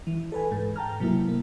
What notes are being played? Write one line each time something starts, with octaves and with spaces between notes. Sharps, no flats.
E3
A4 B4 G#5
G#2
G5 A5 A#5 F6
C3 F#3 A#3 E4
A#3